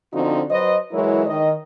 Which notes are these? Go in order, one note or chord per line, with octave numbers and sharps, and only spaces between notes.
D3 F3 C4 D#4 F#4
F#3 B4 C5 D#5
E3 F#3 G#3 E4 A#4 C#5
D#3 D#5